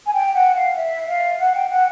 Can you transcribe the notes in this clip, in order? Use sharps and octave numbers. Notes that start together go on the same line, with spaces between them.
G#5
G5
F#5
F5
E5
F5
F#5
G5
F#5